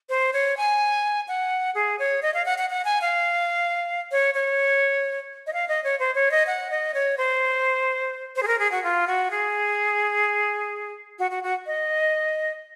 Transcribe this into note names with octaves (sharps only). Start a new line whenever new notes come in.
C5
C#5
G#5
F#5
G#4
C#5
D#5
F5
F#5
F#5
F#5
G#5
F5
C#5
C#5
D#5
F5
D#5
C#5
C5
C#5
D#5
F#5
D#5
C#5
C5
C5
G#4
A#4
G#4
F#4
F4
F#4
G#4
F#4
F#4
F#4
D#5